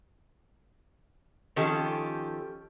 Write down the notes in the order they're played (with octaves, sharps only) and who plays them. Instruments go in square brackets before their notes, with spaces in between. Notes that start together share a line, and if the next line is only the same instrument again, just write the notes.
[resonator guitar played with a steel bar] D#3 F3 C#4 G4 A4